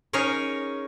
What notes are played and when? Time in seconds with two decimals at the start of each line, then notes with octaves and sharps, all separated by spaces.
0.13 C#4 D#4 G#4 A#4 C#5